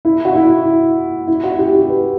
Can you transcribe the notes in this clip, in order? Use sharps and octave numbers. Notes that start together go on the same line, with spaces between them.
E4
F#4
E4
E4
F#4
G4
G4
B4